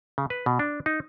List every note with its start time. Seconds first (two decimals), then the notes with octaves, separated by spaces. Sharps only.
0.18 C#3
0.30 B4
0.46 B2
0.59 D4
0.86 D#4